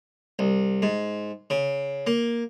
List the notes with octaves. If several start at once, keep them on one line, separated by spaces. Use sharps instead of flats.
C2
G#2
C#3
A#3